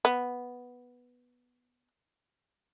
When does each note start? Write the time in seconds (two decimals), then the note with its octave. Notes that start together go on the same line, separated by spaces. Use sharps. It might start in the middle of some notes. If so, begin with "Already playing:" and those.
0.05 B3